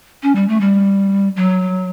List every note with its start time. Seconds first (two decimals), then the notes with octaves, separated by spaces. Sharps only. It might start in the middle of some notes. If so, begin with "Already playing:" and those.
0.23 C#4
0.35 G3
0.48 A3
0.61 G3
1.37 F#3